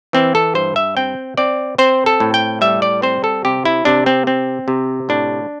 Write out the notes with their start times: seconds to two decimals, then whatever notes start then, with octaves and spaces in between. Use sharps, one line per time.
0.13 E3 C4
0.35 A4
0.55 G2 C5
0.76 E5
0.97 C4 G5
1.37 C4 D5
1.78 C4 C5
2.06 A4
2.20 A2
2.34 G5
2.61 G3 E5
2.82 D5
3.02 C4 C5
3.24 A4
3.45 C3 G4
3.65 E4
3.85 C3 D4
4.06 C4
4.27 C4
4.68 C3
5.09 A2 D4